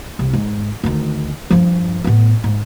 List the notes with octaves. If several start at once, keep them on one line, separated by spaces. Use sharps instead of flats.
C2
G#2
D2 D#3
G2 F3
A2 B3
G#2